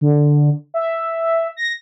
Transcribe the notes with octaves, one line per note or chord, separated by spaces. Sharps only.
D3
E5
A#6